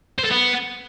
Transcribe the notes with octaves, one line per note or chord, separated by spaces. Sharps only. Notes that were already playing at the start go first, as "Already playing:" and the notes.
C5
A4
B3